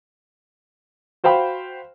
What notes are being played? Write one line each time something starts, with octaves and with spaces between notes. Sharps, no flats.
F#4 C5 F5 G5 B5